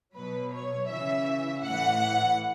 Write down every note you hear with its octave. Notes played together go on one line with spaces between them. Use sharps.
B2 F#3 B4
C#5
C#3 E3 E5
A2 E3 F#5